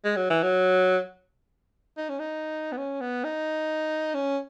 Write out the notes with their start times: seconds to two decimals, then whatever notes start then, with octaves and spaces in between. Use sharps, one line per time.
0.05 G#3
0.17 F#3
0.30 E3
0.43 F#3
1.98 D#4
2.09 C#4
2.20 D#4
2.72 B3
2.78 C#4
3.01 B3
3.24 D#4
4.14 C#4